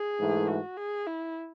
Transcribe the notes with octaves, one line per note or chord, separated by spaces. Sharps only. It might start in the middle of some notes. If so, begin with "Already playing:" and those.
Already playing: G#4
G#2 E3 A3
F#4
G#4
E4